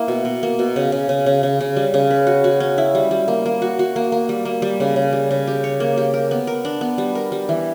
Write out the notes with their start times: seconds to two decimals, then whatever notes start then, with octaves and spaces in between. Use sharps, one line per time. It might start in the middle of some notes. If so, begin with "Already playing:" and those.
Already playing: A#3 E4
0.08 B2
0.25 B2
0.43 A#3
0.59 B2
0.76 C#3
0.92 C#3
1.09 C#3
1.26 C#3
1.43 C#3
1.61 C#3
1.76 G3
1.94 C#3
2.11 B4
2.27 F#4
2.44 F#4
2.60 C#4
2.78 E4
2.95 G3
3.11 G3
3.28 A#3
3.46 A#3
3.62 F#4
3.79 F#4
3.96 A#3
4.12 A#3
4.29 G3
4.45 A#3
4.62 G3
4.80 C#3
4.96 C#3
5.13 G3
5.31 C#3
5.47 G4
5.64 C#5
5.80 A#3
5.98 G4
6.14 A#4
6.31 B3
6.47 A#4
6.65 D4
6.81 B3
6.98 G3
7.15 A#4
7.32 G3
7.49 E3